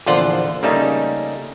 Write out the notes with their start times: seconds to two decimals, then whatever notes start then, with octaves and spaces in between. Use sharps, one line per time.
0.06 A#1 E2 D3 F4 C5 F#5
0.63 C#3 G3 A3 A#3 C#4 D#4